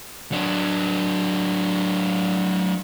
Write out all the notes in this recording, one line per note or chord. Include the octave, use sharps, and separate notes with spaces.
F#3 D4